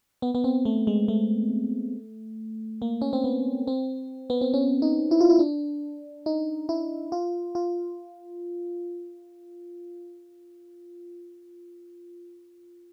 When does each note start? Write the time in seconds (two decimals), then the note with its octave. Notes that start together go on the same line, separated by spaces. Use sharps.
0.22 B3
0.35 B3
0.44 C4
0.65 A3
0.87 G#3
1.08 A3
2.82 A#3
3.02 C#4
3.13 C4
3.24 B3
3.67 C4
4.30 B3
4.41 C4
4.54 C#4
4.82 D#4
5.11 E4
5.21 F4
5.30 E4
5.39 D4
6.26 D#4
6.69 E4
7.12 F4
7.55 F4